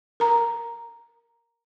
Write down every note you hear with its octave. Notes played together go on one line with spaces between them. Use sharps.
A#4 A#5